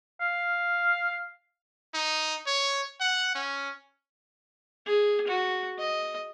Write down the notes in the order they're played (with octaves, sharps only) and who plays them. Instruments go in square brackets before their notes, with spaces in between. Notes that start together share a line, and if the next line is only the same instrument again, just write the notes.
[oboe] F5
[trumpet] D#4
C#5
F#5
C#4
[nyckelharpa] G#4
F#4
D#5